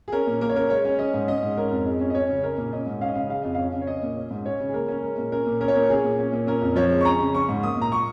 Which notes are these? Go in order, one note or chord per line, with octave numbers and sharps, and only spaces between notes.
G#4
C#4 A#4
A#2
A#3 A#4
C#5
C#4 A#4
G#3 C#5
C#4
C#4 D#5
G#2
C#4 D#5
G#2
C#4 A#4
F2
G#3
C#4
D#5
C#4 C#5
C#3
C#4 A#4
A#2
C#4 D#5
G#2
C#4 F5
D#5
C#3 F5
G#3 F5
F2 D#5
C#4 F5
C#3
C#5
C#4 D#5
A#2
C#4
G#2
C#4 C#5
C#3
G#4
A#3 A#4
C#4
G#3 A#4
A#2
C#4 A#4
A#2
C#4 A#4
C#5
A#2 A#4
C#4 G#4
A#2 G#4
C#4
A#2
C#4 A#4
F2
F3 C#5
G#3
C#6
C#4 A#5
C#3
C#4 C#6
G#2
A#3 D#6
A#2 A#5
A#3 C#6